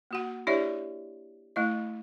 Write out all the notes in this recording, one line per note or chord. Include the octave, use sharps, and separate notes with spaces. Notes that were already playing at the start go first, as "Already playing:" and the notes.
A#3 F#4 F#5
D4 E4 G4 C#5 D5 E5
A3 E4 D#5